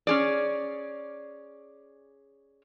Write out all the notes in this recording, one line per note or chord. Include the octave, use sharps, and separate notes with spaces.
C#4 G#4 D5